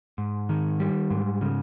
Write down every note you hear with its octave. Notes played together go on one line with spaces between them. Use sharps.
G#2
D#3
G3
G#2
C#3